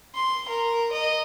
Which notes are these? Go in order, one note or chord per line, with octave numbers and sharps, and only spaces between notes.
C6
A#4
D#5